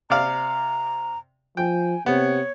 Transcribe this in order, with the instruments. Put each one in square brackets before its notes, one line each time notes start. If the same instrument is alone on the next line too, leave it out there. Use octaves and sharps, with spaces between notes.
[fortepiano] C3 D5 F5 [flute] A#5
[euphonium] F3 [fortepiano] G5 [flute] G#5
[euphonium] C3 [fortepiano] B3 [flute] C#5